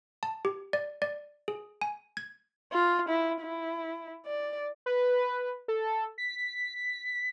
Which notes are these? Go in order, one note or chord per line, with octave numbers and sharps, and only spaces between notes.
A5
G4
D5
D5
G#4
G#5
G#6
F4
E4
E4
D5
B4
A4
B6